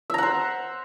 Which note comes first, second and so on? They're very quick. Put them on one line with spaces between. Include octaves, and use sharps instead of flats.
E5 A#5 F#5 C5